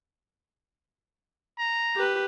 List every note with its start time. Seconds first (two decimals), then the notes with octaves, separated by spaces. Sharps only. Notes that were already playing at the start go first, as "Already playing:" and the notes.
1.58 A#5
1.96 G4 B4